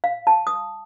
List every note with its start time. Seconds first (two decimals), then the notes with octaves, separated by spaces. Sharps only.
0.04 F5
0.27 A5
0.47 D#6